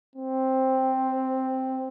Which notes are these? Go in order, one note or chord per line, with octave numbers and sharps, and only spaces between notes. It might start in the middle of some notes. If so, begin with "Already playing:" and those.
C4